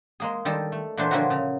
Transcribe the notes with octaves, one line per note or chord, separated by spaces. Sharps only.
G#3 A#3 G#4
D#3 G3 A4
A3
A#2 E3 F#3 A3 D4 C5
D3 F3 G3 A#3 E4 F#4
C#3